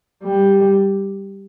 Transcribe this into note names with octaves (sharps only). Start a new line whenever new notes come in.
G3